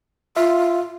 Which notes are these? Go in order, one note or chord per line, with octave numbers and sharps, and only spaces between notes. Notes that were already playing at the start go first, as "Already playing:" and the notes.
F4 E5